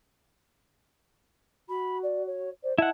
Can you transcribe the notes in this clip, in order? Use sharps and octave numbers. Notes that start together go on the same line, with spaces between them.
F#4 B5
D5
C#5
C5 D5
E4 D#5 F#5 A5